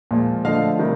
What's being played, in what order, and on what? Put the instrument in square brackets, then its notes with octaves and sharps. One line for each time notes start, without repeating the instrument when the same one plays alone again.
[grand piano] A#2 F3 G#3
D3 F3 A3 D#5 F5
C3 D#3 G3